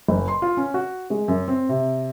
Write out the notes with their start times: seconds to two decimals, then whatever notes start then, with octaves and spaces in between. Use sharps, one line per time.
0.08 F#1
0.28 C6
0.42 F4
0.57 C#4
0.74 F#4
1.10 G#3
1.28 F#2
1.48 C4
1.69 C3